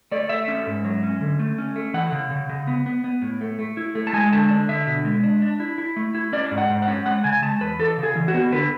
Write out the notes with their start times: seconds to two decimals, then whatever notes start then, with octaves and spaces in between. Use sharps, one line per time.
0.12 A3 D5
0.29 A3 E5
0.48 C#4
0.67 G#2
0.85 F#3
1.03 C#4
1.21 D3
1.39 A3
1.58 C#4
1.76 A3
1.94 E3 F#5
2.12 C#3
2.31 C#3
2.49 C#3
2.67 B3
2.86 B3
3.04 B3
3.22 A2
3.41 A3
3.59 A3
3.77 E4
3.95 A3
4.07 A5
4.13 G#3 G#5
4.32 D3 A5
4.50 D4
4.69 D3 E5
4.87 B2
5.05 G#3
5.23 D4
5.42 D4
5.60 E4
5.78 E4
5.96 A3
6.15 E4
6.33 C#4 D5
6.51 G#2
6.58 F#5
6.70 G#2
6.82 F#5
6.88 C#4
7.06 G#3 F#5
7.24 C#3 G#5
7.42 G#3 A5
7.61 E2 B4
7.79 E3 A4
7.97 C#3
8.03 G#4
8.15 E3
8.28 F#4
8.34 B3
8.52 D3 B4